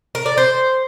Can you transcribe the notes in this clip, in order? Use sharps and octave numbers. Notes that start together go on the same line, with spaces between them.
A#4
D5
C5